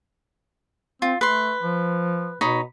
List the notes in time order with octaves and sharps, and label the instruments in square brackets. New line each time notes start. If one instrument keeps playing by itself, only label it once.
[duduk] C4 [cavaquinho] F4
[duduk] A3 [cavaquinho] B4 C6
[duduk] F3
[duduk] B2 [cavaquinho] D#4 C#5 B5